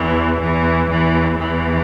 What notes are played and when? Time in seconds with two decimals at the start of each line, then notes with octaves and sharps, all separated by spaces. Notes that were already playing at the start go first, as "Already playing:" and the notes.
Already playing: E2 E3
0.41 E2 E3
0.91 E2 E3
1.40 E2 E3